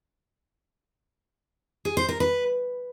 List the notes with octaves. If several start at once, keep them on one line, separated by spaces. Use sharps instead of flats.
G#4
C5
A#4
B4